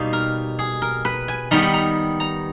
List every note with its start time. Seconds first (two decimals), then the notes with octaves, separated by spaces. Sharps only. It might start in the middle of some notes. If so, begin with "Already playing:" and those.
Already playing: B2 G3 A#3 D#4
0.13 A#4
0.59 G#4
0.82 A#4
1.05 B4
1.28 G#5
1.51 D#3 G3 B3 A#5
1.62 B5
1.74 A#5
2.20 A#5